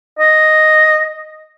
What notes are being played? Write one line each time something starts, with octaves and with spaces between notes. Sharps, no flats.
D#5